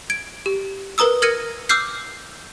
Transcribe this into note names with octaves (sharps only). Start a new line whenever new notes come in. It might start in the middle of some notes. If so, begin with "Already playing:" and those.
G#6 D7
G4
A#4 B4 A#5 D#6 E6
A#4 F6 G#6 A#6 C#7 D#7
D6 E6 F6 G6 C7